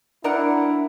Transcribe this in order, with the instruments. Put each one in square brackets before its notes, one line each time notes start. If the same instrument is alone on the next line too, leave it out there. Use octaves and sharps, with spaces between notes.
[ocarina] D4 [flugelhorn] E4 [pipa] A#4 D5 F#5